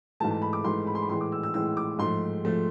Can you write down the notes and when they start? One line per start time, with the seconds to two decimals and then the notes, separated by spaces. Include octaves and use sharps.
0.20 G#2 E3 A3 A5
0.31 A5
0.42 B5
0.53 D6
0.64 G#2 E3 A3 C6
0.87 B5
0.95 C6
1.02 B5
1.09 A2 E3 G#3 C6
1.21 D6
1.32 E6
1.43 E6
1.54 A2 E3 G#3 E6
1.77 D6
1.99 G#2 F3 A3 C6
2.45 F3 A3